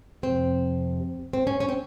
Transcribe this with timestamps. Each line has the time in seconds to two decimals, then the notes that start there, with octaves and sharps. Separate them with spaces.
0.23 F2 C3 F3 C4
1.33 C4
1.47 C#4
1.60 C#4
1.69 C4